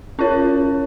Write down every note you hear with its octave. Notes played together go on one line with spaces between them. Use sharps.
C#4 F4 A#4 C#5